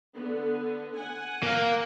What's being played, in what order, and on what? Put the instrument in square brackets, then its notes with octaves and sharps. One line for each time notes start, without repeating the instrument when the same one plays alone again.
[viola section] D3 B3
F#5 G#5
[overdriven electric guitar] A#3 F5